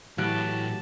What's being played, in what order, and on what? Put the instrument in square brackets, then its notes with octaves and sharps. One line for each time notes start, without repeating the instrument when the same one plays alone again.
[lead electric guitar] A2 [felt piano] E3 F#6 D7 [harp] F#3 [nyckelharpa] G4 A5